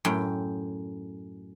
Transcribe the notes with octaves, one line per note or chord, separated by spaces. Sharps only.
F#2 A2 G5